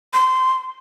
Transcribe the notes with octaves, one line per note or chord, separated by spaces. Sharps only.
C6